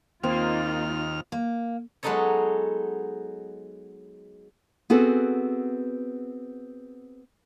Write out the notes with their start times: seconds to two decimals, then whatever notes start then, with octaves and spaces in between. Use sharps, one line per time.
0.23 D#2 A#3 C4 D#4 F4 F6
1.32 A#3
2.03 F#3 G#3 B3 D#4 A4 C#5
4.90 B3 C4 F#4 G#4 A4 B4